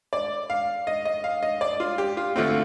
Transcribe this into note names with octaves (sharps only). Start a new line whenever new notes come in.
D5
F5
D#5
D#5
F5
D#5
D5
F4
G4
F4
D2 D3 A3 C4 F4